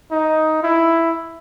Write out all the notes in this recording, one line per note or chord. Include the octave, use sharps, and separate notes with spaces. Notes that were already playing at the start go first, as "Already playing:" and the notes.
D#4
E4